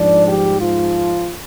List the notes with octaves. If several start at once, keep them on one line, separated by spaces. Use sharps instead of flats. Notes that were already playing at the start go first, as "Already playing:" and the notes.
Already playing: G#2 F3 D4 D5
G3 G4
F3 F4